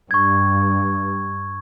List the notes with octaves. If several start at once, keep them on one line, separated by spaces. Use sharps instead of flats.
G2 C#6 G#6